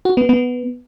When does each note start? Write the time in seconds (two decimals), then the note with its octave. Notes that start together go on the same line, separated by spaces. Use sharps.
0.05 F#4
0.17 B3
0.29 B3